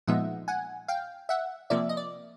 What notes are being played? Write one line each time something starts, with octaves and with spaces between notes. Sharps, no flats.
A#2 F3 G#3 B3 D#4 E5 F#5
F#5 G#5
F5 G5
E5 F#5
C3 F3 A#3 D5 E5
D#5
D5